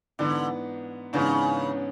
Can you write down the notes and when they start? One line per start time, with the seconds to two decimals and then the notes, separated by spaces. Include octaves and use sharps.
0.19 G#2 D3 E3 B3 D4
1.13 G#2 C#3 E3 B3 D4